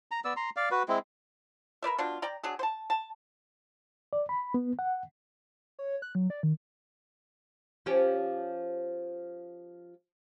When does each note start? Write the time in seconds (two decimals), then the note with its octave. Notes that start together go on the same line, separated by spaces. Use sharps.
0.11 A#5
0.25 B3 D5 E6
0.37 A#5 C6
0.56 D5 F5
0.71 F#4 B4
0.88 G#3 C4 E4
1.82 A#4 B4 D5 E5
1.98 B2 D4 F4
2.22 D5 G5 A#5
2.43 F#3 D4 G#4
2.59 C5 A5
2.90 A5
4.13 D5
4.29 B5
4.54 B3
4.79 F#5
5.79 C#5
6.02 F#6
6.15 F#3
6.30 D5
6.43 D#3
7.86 F3 C#4 G4